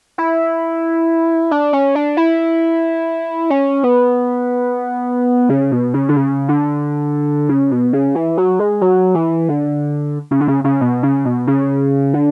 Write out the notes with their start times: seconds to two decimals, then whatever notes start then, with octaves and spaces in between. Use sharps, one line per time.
0.18 E4
1.51 D4
1.73 C#4
1.95 D4
2.17 E4
3.50 C#4
3.83 B3
5.49 C#3
5.72 B2
5.94 C#3
6.09 D3
6.16 C#3
6.49 D3
7.49 C#3
7.71 B2
7.93 C#3
8.15 E3
8.37 F#3
8.59 G#3
8.81 F#3
9.15 E3
9.49 D3
10.31 C#3
10.41 D3
10.48 C#3
10.64 C#3
10.81 B2
11.03 C#3
11.25 B2
11.47 C#3
12.14 D3